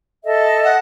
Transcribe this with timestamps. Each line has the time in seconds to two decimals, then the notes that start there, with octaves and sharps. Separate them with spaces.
0.24 A4 D#5 E5
0.64 F#5